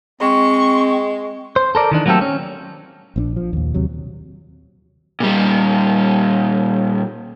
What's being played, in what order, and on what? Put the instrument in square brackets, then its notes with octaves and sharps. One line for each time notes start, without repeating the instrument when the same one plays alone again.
[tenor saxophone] G#3 [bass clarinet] C4 [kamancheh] C#6
[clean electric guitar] C5
A4 A#4 D5
D#3 E3 D4
F#3 A3 A#3 C4 G4 A4
C#4
[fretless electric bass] A#1 C4 D4
F3
D#2 A#2
D#2 C3 F#3
[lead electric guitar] A#2 G3